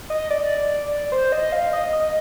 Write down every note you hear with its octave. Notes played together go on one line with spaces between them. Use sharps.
D#5
D5
C5
D#5
F5
D#5
D#5